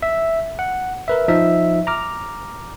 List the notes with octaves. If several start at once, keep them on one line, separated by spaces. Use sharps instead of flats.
E5
F#5
A#4 B4 E5
F3 D#4 E5
A#5 D6 F6